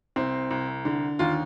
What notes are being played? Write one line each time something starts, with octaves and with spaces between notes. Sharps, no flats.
C2 C4
C2
D3
D#2 F4